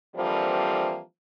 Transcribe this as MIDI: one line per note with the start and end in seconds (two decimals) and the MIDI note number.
0.15 0.99 50
0.15 0.99 52
0.15 0.99 53
0.15 0.99 55
0.15 0.99 58
0.15 0.99 60